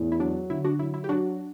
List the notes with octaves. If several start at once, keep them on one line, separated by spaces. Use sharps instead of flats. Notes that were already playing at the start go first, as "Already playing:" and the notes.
Already playing: E2 A2
E4
F#3 D4
D3 E4
D4 F#4
F#3 E4
E4
G4
F#3 D4 F#4